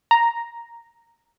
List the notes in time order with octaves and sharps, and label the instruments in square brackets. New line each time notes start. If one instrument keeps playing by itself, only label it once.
[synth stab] A#5